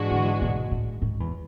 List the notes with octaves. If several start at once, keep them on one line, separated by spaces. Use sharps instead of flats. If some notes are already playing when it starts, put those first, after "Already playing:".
Already playing: G#2 E3 G#3 D4 F#4
D3
B2
A2
G#2
E2